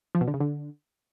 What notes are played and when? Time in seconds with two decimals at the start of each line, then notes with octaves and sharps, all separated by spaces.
0.15 F3
0.21 B2
0.28 D3
0.34 C#3
0.40 D3